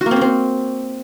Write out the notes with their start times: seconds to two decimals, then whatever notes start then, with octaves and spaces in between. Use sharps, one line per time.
0.01 F#4
0.06 A#3
0.11 C4
0.16 C#4
0.21 C4